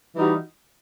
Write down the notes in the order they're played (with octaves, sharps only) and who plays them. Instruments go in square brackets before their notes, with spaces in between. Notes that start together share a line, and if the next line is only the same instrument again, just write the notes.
[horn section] E3 G3 D#4 F#4